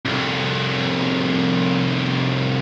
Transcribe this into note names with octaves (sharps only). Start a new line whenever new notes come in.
C2 F2